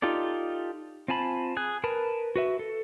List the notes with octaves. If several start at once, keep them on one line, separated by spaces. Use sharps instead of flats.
D#4 F4 G4 A4 D5
C4 F4 G#5 A5 B5
G#4 G#5 F#6
A#4 B4 A5 B5
F#4 B4 E5
A4